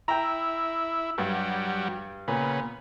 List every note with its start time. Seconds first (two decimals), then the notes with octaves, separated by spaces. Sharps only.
0.08 E4 G5 A#5
1.18 G2 F#3 G3
2.28 A#2 C#3 B3